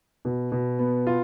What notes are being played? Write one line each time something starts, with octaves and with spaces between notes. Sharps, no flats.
B2
B2
B3
F4